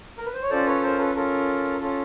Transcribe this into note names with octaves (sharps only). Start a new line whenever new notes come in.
A#4
B4
C5
C#5
C#4 F4 A4 C5 D5
B4 C#5
A#4 C5
A4 B4
C#4 F4 A4 A#4
C#4 F4 A4